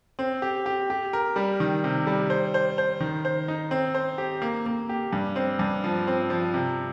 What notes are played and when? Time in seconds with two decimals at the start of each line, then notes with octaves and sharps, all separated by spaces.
0.19 C4
0.42 G4
0.66 G4
0.90 G4
1.13 A#4
1.36 G3
1.60 D#3
1.84 C3
2.07 G3
2.30 C5
2.54 C5
2.78 C5
3.00 D#3
3.25 C5
3.48 D#4
3.71 C4
3.95 C5
4.18 G4
4.42 A#3
4.66 A#3
4.89 G4
5.13 G2
5.36 C4
5.59 G2
5.84 F3
6.07 C4
6.30 F3
6.54 C3